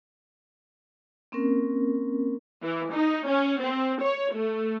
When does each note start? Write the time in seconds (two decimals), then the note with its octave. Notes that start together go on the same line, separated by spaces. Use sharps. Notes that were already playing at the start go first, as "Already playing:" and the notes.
1.32 A#3 C4 C#4 A#4
2.63 E3
2.93 D#4
3.28 C#4
3.61 C4
4.03 C#5
4.34 A3